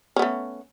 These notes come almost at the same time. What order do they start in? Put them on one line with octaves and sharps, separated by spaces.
C#4 B3 A3